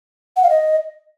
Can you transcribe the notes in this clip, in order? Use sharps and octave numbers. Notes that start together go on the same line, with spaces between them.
F#5
F5
D#5